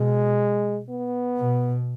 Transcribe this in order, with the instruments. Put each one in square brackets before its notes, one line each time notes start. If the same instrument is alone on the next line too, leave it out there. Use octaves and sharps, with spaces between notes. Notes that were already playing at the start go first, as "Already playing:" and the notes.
Already playing: [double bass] B2 [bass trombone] G#3
[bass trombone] B3
[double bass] B2